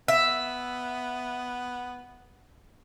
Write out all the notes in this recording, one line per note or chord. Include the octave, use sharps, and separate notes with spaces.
B3 E5